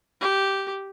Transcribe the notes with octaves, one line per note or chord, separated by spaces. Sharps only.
G4